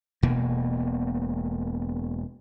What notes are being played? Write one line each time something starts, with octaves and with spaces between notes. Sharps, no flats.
E1 B2 A#3